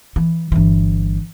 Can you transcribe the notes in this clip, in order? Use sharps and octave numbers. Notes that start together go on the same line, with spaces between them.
E3
G1 E3